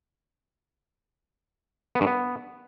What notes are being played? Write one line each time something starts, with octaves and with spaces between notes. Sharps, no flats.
B3
G2
B3